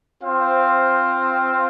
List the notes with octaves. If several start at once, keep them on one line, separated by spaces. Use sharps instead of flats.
C4 F4 C5 F5